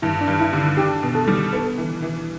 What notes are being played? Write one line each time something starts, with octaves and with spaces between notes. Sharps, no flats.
G2 E4
D4
G2
E4
D3
D4 G4
B2
A4
G3
B3 A4
E3
E3